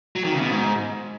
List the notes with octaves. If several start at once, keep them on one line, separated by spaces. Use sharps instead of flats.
F#3
D#3
C#3
B2
G#2